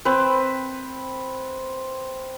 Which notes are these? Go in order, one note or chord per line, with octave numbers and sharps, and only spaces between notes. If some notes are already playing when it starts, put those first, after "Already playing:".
C4 B4